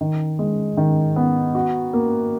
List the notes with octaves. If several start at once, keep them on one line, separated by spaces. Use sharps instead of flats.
D#3
G#3
D#3
B3
F#4
A#3